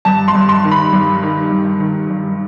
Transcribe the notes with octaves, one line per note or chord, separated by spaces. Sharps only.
G2 A5
C6
G2
C6
D#3
B5
G2
D#3
G2
D#3
G2